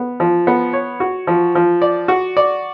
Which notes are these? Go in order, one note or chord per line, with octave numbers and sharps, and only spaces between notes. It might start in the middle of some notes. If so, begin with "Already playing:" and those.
Already playing: B3
F3
B3
C#5
F#4
F3
F3
D5
F#4
D5